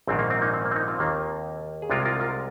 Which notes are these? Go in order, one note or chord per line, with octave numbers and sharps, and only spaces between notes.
A#1 G#2 D#3 C4
A#3
C4
A#3 D#4
C4
A#3
C4
A#3 D#4
C4 F4
D#2 D#3 A#3
G#4
C2 C3 G#3 F4 A#4
F4 A#4
F4 A#4